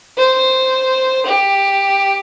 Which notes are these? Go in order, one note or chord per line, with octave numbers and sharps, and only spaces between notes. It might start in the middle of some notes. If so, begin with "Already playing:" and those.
C5
G4